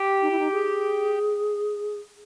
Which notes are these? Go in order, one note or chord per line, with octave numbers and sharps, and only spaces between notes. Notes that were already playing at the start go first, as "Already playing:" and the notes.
Already playing: G4
D#4
E4
D#4
G#4